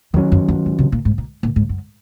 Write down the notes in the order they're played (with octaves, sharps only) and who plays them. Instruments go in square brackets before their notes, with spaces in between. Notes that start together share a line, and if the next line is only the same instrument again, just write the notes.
[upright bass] F2 [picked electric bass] D#3 F#3 C#4
[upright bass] F#2
F#2
G#2
C3
A#2
G#2
A#2
A#2
G#2
F#2